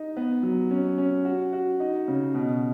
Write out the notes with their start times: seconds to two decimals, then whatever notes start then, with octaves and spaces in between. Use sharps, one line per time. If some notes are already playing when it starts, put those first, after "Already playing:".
Already playing: D#4
0.17 B3
0.43 F#3
0.71 C#4
0.98 C#4
1.25 F#4
1.53 F#4
1.80 D#4
2.08 C#3
2.34 B2